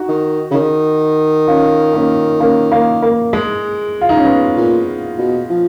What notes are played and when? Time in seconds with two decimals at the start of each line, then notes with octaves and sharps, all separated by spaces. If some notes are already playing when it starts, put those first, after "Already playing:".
Already playing: D#4 F#4
0.08 D#3
0.51 C#3
0.54 D#3
1.47 C#4 F4
1.93 A#3 C#4
2.40 A#3 C#4
2.72 A#3
3.03 A#3
3.33 G#3
4.01 F4
4.09 D#4
4.17 C#4
4.25 G#3 B3
4.56 A#2
5.18 B2
5.50 F3